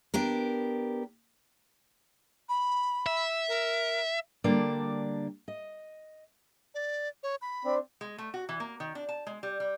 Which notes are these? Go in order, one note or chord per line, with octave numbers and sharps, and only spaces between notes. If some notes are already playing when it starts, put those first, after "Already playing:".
B3 D4 G4 A#4
B5
E5
A#4
D3 G3 A#3 D4 D5
D#5
D5
C#5
B5
C4 D4
G#3
A3
F#4
E3
A#3
D#3
D4
A5
G#3
G3
G3